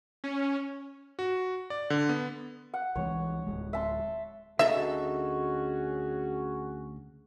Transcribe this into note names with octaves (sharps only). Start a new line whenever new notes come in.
C#4
F#4
D5
D3
B3
F#5
C2 E3 G#3 C#5
D1 C#2 G#3
E5 A5 C6
D2 C#4 D#4 F#4 G#4 A4 E5